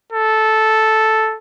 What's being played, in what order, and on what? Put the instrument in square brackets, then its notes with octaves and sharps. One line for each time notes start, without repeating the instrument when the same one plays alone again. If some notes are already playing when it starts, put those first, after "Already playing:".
[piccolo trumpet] A4